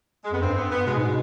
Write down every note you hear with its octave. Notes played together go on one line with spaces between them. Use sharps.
G#3
F2 B3
G2 C4
B3
B3
B2 G#3
G#2
B2 G#3